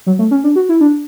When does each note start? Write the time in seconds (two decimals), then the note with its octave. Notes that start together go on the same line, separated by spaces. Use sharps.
0.06 F#3
0.19 A3
0.31 C#4
0.44 D4
0.56 F#4
0.69 E4
0.81 D4